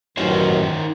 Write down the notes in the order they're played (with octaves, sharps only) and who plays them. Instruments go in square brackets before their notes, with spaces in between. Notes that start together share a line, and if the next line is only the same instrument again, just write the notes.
[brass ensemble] A1 F#2 [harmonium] D#3 [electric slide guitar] D#4 C5 C#5